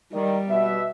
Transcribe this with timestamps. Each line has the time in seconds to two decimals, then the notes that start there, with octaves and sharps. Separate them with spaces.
0.13 D#3 G3 D5
0.49 B2 B3 E5